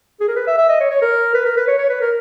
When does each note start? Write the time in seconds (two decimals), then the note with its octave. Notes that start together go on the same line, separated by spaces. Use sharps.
0.20 G#4
0.28 A#4
0.36 B4
0.47 E5
0.57 E5
0.69 D#5
0.80 C#5
0.91 C#5
1.02 A#4
1.34 B4
1.45 A#4
1.57 B4
1.67 C#5
1.78 C#5
1.89 B4
2.01 A#4